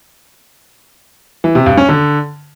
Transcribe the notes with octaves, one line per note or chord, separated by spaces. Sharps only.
E3
C3
G2
C#4
D3